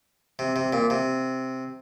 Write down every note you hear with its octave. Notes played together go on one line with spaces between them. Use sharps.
C3
C3
A#2
C3